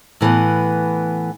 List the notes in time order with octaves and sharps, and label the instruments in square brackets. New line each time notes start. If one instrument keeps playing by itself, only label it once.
[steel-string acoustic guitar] A2 E3 B3